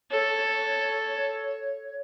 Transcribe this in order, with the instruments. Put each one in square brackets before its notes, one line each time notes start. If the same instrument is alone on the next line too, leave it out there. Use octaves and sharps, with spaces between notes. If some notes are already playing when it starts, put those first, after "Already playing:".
[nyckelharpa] A4 [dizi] C#5